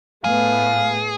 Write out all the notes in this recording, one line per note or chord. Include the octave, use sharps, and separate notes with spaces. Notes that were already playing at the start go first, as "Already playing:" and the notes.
A2 A3 B3 G#4 F5